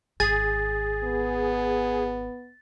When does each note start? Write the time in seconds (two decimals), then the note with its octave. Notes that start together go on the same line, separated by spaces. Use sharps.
0.20 G#1 G#4 A6
1.04 B3